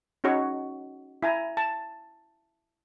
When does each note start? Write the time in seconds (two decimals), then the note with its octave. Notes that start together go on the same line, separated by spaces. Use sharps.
0.24 C#4 D#4 F#4 C#5 C#6
1.23 E4 G#5 A#5
1.57 A5